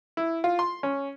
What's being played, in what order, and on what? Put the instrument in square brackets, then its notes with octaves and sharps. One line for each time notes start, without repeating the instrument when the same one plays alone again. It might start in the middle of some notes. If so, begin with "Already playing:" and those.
[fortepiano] E4
F4
C6
C#4